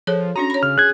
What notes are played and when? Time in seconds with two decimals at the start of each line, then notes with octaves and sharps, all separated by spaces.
0.07 F3 G#4 A4 C#5
0.36 C#4 D4 F#4 A#5
0.50 C#5 B5
0.63 C#3 F6
0.78 G#4 F#6 G#6